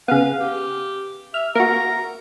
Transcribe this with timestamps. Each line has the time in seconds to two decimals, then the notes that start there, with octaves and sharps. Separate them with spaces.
0.08 C#3 B3 F5
0.40 G4
1.34 E5 F6
1.55 A#3 F#4 A#5